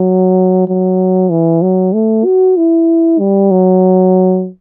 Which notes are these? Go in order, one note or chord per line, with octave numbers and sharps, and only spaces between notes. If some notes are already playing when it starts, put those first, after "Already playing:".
Already playing: F#3
F#3
E3
F#3
A3
F#4
E4
G3
F#3